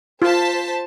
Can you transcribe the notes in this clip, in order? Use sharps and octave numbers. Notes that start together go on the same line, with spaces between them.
F4 C5 A5 B6